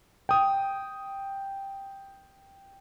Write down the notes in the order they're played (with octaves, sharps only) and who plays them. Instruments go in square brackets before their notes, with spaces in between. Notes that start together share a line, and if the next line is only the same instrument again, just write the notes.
[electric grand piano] G5 D#6